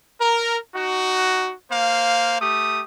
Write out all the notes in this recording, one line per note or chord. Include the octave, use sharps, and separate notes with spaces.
A#4
D#4 F#4
A#3 C5 F5
A3 G4 D#6